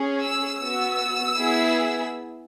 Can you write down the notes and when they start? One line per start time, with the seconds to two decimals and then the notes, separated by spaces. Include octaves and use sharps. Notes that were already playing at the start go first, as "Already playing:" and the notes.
Already playing: C#4 G#4
0.21 E6
0.60 B3 F#4 E6
1.39 B3 E4 G#4